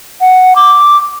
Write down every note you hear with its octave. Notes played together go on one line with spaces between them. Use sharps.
F#5
D6